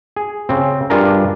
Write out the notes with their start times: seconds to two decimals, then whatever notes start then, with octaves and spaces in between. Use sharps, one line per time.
0.16 G#4
0.49 C#3 C4
0.90 G2 D4 F4 G#4 A#4 A#5